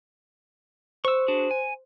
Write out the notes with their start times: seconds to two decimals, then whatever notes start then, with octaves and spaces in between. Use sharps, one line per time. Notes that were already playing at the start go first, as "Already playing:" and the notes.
1.05 C5 C#6 E6
1.28 D4 F#4 G#4
1.51 G#5